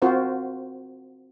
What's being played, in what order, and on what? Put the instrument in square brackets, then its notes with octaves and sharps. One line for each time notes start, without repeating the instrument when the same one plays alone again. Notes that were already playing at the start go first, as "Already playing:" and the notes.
[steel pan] C4 F4 F#4 A#4 C5 F#5